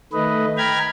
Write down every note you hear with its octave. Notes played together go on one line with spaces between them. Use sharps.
D#3 A3 B4 D#5
G5 A#5 B5 F6 G#6